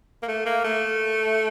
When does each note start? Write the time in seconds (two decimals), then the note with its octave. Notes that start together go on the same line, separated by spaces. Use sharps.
0.23 A#3
0.28 A3
0.46 A#3
0.64 A3